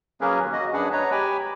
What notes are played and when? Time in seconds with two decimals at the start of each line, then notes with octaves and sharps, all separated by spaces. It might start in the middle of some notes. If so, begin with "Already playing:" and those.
0.21 F#3 A#3 C#4 G#4 A#4 B4
0.41 D#2
0.52 F#4 D#5
0.73 F#2 D4 G#4 B4 F#5
0.92 B4 C#5 D#5 A#5
1.11 G4 G5 G#5 B5